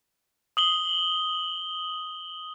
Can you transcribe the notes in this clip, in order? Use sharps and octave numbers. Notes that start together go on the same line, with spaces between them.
D#6 F#7 G7